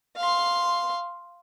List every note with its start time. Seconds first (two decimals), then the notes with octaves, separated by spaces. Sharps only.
0.17 F5 C6